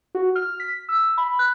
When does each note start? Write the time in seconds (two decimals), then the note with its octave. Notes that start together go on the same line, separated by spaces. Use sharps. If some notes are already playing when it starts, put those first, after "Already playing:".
0.15 F#4
0.36 F6
0.60 B6
0.89 E6
1.17 B5
1.39 F#6